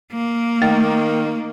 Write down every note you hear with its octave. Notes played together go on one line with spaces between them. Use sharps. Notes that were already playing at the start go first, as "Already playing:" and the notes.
A#3
D#3 A3